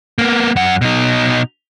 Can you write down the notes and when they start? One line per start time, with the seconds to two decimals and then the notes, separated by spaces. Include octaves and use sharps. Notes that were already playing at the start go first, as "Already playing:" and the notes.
0.18 A#3 B3
0.56 F#2 F#5
0.81 B2 D#4